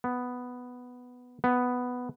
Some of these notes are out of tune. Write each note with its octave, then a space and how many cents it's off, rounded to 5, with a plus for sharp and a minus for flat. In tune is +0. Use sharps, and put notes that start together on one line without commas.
B3 +5
B3 +5